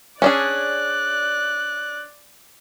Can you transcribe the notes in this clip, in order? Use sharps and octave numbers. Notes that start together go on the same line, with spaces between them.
C#4 D4 G#4 D5 F#6